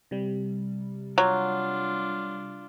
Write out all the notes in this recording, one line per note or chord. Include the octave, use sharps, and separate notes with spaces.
C3 G3
F#3 D4 F4